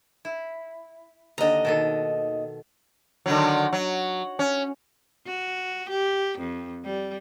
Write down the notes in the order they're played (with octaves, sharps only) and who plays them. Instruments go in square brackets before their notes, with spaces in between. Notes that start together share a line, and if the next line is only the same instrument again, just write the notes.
[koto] E4
[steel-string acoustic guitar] D#2 D#5 [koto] D3 A#5
[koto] B2 D#3 A4
[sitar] D3 D#3 F#3
F#3
C#4
[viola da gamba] F#4
G4
F2
G3